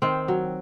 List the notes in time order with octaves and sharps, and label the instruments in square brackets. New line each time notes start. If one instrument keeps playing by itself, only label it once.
[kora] D#3 C4
F#3